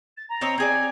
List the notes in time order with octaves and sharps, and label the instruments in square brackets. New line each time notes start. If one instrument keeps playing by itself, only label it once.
[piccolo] A6
A#5
[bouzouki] C4 C#5 D#5
[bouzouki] C4 G#4 D5 [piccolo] G#6